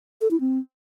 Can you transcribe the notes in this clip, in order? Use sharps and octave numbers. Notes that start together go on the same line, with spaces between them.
A4
E4
C4